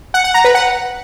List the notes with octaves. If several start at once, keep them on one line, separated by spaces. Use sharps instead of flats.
F#5
F#5
A#5
B4
F#5